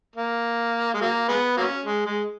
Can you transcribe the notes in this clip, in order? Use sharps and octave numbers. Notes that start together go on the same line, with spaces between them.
A#3
G#3
F#3 A#3
G#3 B3
F#3 A#3 C#4
G#3
G#3